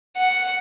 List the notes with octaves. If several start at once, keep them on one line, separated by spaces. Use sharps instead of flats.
F#5